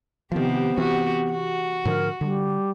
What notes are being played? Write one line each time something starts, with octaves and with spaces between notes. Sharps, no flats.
C3 D#3 F3 B3 C4 G4
E3 C4 F#4 G4
F#4
G#2 D3 F3 A#4
D3 G3